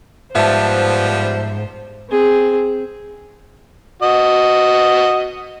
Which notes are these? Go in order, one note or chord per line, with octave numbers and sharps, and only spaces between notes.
G#2 F3 G3 B3 C5 E5 A5
C4 G#4
F#4 D#5